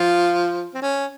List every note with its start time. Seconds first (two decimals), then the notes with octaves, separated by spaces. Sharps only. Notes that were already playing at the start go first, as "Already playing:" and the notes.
Already playing: F3 F4
0.74 C4
0.82 C#4